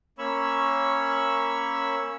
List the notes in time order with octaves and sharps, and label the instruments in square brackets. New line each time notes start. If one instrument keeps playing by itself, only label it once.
[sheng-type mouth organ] A#3 C#4 C#5 B5 C#6 E6